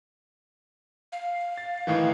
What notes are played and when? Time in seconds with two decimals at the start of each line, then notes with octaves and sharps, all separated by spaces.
1.12 F5
1.58 A6
1.87 A2 D#3 E3